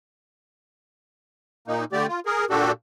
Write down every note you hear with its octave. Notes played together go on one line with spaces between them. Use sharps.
A#2 A#3 D#4
D3 A3 G4 D5
F4
G#4 A#4
A#2 D4 F#4 G4 A4